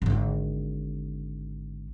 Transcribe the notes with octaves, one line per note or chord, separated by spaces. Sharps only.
G#1 D3